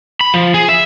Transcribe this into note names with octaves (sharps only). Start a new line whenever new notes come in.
B5
F3
G#4
E5